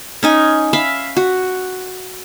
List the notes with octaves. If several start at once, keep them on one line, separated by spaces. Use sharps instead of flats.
C#4 D#4 G#5
E5 F5 B5
F#4